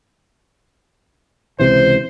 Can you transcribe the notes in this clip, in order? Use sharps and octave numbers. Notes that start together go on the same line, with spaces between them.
C#2 C3 E3 C5